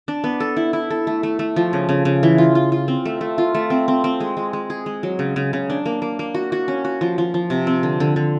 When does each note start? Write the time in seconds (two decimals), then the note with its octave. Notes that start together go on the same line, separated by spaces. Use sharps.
0.08 D4
0.24 B3
0.40 A4
0.57 E4
0.73 E4
0.90 A4
1.07 A3
1.23 A3
1.39 A3
1.56 F3
1.73 C#3
1.89 C#3
2.05 C#3
2.23 E3
2.38 F4
2.55 F4
2.72 F4
2.88 C4
3.05 A3
3.21 A3
3.38 F4
3.55 A3
3.70 C4
3.88 C4
4.04 C4
4.20 G#3
4.37 G#3
4.53 G#3
4.70 G#4
4.86 G#3
5.03 F#3
5.19 C#3
5.36 C#3
5.53 C#3
5.70 D4
5.86 A#3
6.02 A#3
6.19 A#3
6.34 F#4
6.52 F#4
6.68 C#4
6.85 F#4
7.01 F3
7.18 F3
7.34 F3
7.50 C3
7.67 C4
7.83 D3
8.00 D3
8.16 D3